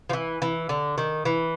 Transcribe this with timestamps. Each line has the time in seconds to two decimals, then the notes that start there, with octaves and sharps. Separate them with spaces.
0.09 F3
0.13 E3
0.42 E3
0.69 D3
0.98 D#3
1.25 E3